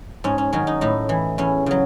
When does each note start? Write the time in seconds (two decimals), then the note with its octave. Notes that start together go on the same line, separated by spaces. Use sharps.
0.24 G#2 C#4
0.38 C#4
0.53 D#3 F#3 C#4
0.67 D#4
0.81 A2 D#4
1.09 E3
1.38 E2 C#4
1.66 C#3 F#3